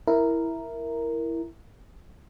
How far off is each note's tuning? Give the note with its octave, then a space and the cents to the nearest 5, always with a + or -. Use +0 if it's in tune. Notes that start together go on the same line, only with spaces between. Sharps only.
E4 +0 A#4 +0